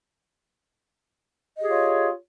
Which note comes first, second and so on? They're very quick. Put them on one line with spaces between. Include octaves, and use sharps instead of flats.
D#5 G4 G#4 F4 C#5